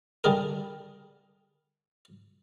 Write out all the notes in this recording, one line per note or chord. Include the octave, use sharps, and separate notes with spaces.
D3 G3 G#4 A#4